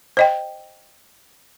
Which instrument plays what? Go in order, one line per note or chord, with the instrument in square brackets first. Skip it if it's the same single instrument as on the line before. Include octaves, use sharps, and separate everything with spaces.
[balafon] C5 D#5 G5